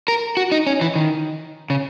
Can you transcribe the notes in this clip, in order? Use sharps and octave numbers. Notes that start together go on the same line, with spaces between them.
A#4
F#4
D#4
C#4
E3
D#3
C#3